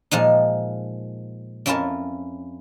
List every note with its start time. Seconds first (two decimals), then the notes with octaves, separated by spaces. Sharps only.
0.11 A#2 F3 G#3 D#4
1.66 F2 C#4 E4 F4 A#4 A5